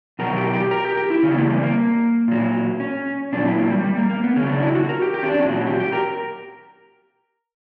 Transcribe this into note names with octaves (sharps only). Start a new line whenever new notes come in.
B2 F#3 A#4
G4
G4
A#4
G4
G4
E4
C#3 E3 C#4
A#3
G3
A#3
A#2 F#3
C#4
A#2 F#3 D4
E4
A#3
G3
G3
A#3
A#3
B3
C#3 F#3 C#4
D4
E4
F#4
A#4
G4
G4
C#4
D4
A#2 F#3 C#4
F#4
G4
G4
A#4